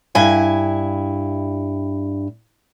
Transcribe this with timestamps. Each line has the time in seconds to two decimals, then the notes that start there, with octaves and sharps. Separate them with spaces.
0.15 G2 E4 G#5